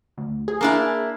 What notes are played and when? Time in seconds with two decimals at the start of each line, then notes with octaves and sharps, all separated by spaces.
0.18 D2
0.48 G#4
0.61 A#3 D4 E4